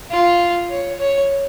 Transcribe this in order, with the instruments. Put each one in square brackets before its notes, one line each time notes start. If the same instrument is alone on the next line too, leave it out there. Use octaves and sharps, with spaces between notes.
[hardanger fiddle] F4
C#5
C#5